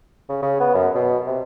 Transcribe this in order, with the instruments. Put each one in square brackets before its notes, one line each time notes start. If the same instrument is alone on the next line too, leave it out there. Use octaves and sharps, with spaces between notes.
[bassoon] C#3
C#3
B3
F#2
B2
C3